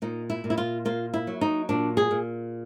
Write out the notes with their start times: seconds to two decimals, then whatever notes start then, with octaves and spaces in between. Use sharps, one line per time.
0.02 A#2 D#4
0.30 E4
0.44 A#2
0.50 E4
0.58 F4
0.85 A#3 F4
1.14 E4
1.27 F#3
1.41 D#4
1.69 A#2 D4
1.97 G#4
2.11 A#2